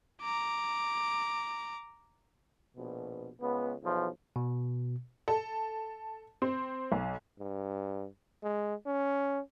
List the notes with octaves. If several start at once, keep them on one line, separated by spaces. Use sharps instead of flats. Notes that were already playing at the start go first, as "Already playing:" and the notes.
A#5 D6
A#1 B2
C#2 B3
B1 E2 F3
B2
A4
C4
B1
G2
G#3
C#4